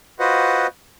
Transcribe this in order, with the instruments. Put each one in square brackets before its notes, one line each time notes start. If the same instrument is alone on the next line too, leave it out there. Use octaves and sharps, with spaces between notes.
[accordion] F4 F#4 B4 C5 D#5 F#5